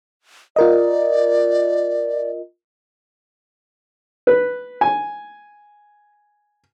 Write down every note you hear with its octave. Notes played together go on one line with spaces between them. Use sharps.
F4 A#4 D5 D#5
B4
G#5